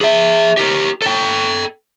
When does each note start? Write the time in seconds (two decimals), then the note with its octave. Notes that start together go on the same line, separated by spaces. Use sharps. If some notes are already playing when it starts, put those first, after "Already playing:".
0.01 G#4 E5
0.57 G4 A#4
1.02 A4 G5